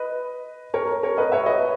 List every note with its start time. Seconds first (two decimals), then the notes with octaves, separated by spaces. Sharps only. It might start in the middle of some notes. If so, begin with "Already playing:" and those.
Already playing: B4 D#5
0.74 A#4 C#5
1.03 A#4 C#5
1.18 B4 D#5
1.32 C#5 E5
1.46 B4 D#5